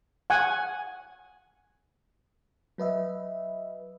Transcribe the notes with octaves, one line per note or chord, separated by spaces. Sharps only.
F#5 G#5
F#3 B4 D#5 E5